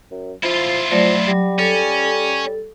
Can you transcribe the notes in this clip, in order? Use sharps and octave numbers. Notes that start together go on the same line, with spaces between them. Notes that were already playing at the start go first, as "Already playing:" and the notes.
F#2
F3 E4 F4
F3 F#3 A3 D5
F#3 G3
C#4 A4